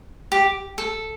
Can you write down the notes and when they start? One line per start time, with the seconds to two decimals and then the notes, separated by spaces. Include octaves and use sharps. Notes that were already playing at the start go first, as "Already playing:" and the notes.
0.32 G4
0.78 A4